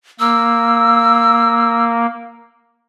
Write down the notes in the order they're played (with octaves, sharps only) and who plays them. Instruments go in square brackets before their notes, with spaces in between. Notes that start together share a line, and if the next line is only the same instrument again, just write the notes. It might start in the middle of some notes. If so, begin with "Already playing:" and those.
[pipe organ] A#3 [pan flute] E6